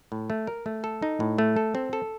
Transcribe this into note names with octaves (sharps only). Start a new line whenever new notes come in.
A2
A3
A#4
A3
A4
D#4
A2
A3
A4
C4
A4